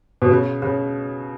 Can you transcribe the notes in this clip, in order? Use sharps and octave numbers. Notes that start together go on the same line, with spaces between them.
B2
C#3
C#3